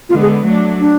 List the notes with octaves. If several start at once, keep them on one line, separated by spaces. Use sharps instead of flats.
D3 G#3 B3 F4
G#4
F#3 A3 D4
D4